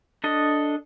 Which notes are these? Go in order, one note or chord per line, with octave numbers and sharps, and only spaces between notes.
D4 A4 D#5